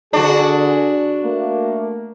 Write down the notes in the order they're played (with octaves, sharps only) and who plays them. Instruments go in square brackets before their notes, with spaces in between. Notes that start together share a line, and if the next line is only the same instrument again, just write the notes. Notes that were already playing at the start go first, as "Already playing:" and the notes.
[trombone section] D3 G#4 [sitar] D4 F#4
[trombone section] A3 A#3